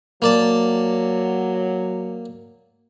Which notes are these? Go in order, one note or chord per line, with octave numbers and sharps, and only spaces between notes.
F#3 A#3 D5 A5